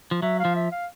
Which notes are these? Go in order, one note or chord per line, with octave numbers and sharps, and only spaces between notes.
F3
F#3 E5
F5
F3
E5
F5